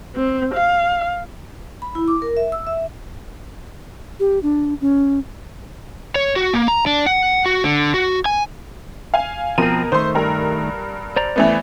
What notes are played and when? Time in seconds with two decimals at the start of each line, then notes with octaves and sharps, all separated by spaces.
0.15 C4
0.54 F5
1.82 B5
1.95 E4
2.08 D6
2.22 A#4
2.37 E5
2.52 E6
2.67 E5
4.20 G4
4.43 D4
4.81 C#4
6.16 C#5
6.36 F#4
6.53 A#3
6.68 A#5
6.87 D4
7.06 F#5
7.46 F#4
7.64 D3
7.94 F#4
8.25 G#5
9.14 F5 G#5
9.58 B2 F3 C4 A#4 D#7
9.92 D#3 A3 C5 C6
10.15 G2 A#4
11.16 C5 D5 A#5
11.36 E3 A3 B3